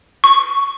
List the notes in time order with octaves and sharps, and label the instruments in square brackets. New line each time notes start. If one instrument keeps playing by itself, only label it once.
[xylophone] C#6